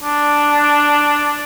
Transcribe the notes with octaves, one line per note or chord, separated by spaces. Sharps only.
D4